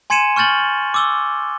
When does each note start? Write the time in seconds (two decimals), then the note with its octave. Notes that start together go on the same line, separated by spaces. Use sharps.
0.10 G#5 C6 G#6 C#7 D#7 E7
0.36 C#6 F6 G6 A6 F#7 G7
0.94 D6 E6 G7